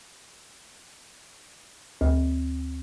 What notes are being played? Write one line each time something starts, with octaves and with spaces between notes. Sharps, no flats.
D2